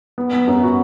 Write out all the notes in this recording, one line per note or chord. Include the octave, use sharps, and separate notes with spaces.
B3
B3
F#2
F#4